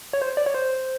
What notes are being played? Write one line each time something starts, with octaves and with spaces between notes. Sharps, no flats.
C#5
C5
D5
C#5
C5